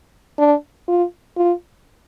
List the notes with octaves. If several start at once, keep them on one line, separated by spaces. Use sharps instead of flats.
D4
F4
F4